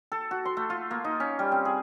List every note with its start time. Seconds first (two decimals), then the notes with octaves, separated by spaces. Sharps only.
0.12 A4
0.31 F#4
0.45 C6
0.57 A3
0.70 F4
0.91 A#3
1.04 D#4
1.20 C#4
1.39 G3
1.52 C4
1.65 G#4